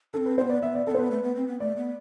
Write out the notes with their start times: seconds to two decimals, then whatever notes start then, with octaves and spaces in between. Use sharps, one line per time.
0.14 C4 D4 A4
0.26 B4
0.38 C4 C5
0.42 B3
0.49 D5
0.62 B3 E5
0.75 D5
0.87 C4 A4
0.91 B3 C5
0.99 B4
1.11 A3
1.23 B3
1.36 C4
1.48 B3
1.60 A3 D5
1.77 B3